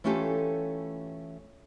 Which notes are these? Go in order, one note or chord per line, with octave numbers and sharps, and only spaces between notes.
E3 A3 C#4 F4 G4 A4